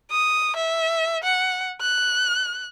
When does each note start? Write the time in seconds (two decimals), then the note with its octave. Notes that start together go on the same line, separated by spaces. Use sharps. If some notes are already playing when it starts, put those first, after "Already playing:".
0.11 D#6
0.56 E5
1.23 F#5
1.81 F#6